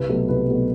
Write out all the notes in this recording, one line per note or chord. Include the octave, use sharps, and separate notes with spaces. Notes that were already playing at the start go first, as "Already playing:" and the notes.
Already playing: C2 B4
B2 F#3 A3
C2 B4
B2 F#3 A3